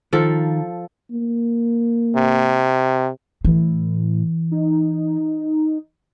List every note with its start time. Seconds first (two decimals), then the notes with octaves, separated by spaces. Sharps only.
0.13 D#3 F3 A4
1.10 A#3
2.16 C3
3.45 A2 E3
4.51 D#4